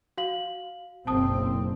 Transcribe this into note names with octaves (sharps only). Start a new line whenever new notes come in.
F#4 F5 F#7
F#1 B1 C4 A5 D#6